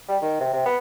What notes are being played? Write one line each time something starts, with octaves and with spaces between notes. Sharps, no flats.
G3
D#3
C3
C3
B3